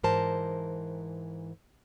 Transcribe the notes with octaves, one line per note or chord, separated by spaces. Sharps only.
G#2 E3 A#4 C5 A5